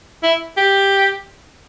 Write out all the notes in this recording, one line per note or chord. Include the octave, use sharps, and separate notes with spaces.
E4
G4